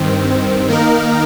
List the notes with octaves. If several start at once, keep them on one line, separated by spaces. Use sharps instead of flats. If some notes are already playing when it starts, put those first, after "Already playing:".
Already playing: G2 D#3 C4
D#3 A#3 D#4 A#4